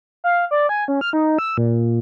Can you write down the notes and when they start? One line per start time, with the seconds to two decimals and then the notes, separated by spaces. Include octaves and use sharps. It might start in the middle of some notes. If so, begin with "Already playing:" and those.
0.24 F5
0.51 D5
0.69 G#5
0.88 C#4
1.01 F6
1.13 D#4
1.38 E6
1.57 A#2